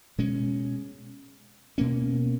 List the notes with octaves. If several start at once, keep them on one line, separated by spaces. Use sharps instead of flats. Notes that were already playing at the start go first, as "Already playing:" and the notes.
B2 G#3 C#4
B2 A#3 C#4